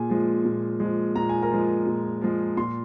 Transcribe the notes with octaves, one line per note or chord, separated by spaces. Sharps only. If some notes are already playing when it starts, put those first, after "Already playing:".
Already playing: A#2 G#4 G#5
F3 G#3
A#2
F3 G#3
A#2 A#5
G#5
A#4 A#5
F3 G#3
A#2
F3 G#3
A#2 C6